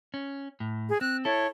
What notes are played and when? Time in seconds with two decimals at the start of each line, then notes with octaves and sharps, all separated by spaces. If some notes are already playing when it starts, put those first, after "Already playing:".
0.14 C#4
0.60 A2
0.89 G#4
1.01 C4 F#6
1.25 E4 A4 C#5